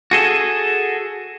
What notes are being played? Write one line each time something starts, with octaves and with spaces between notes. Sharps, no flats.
F#4 G#4 A4